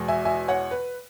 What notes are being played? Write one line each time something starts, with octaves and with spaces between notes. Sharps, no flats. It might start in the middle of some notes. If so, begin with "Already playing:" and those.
Already playing: E2 B2 G#3
E5 G#5
E5 G#5
C#5 F#5
B4